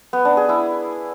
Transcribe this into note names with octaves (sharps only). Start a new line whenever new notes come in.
B3
D4
G#4
E4